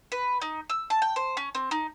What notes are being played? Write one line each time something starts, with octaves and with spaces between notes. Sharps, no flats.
B4
D#4
E6
A5
G5
C5
C#4
C4
D#4